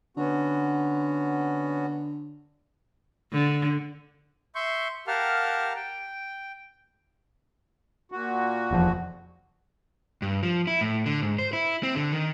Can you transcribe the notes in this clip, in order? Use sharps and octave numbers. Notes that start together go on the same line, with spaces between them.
D3 B3 C#4 F#4
D3
E5 C6 C#6 G6
G4 A#4 F5 F#5 A5 F6
G5
A#2 F#4
F1 E2 F3
G2
F3
E4
A2
D3
G#2
C5
E4
C4
D3
D#3